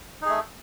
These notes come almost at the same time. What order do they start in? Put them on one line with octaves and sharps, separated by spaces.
D#4 G#4 A3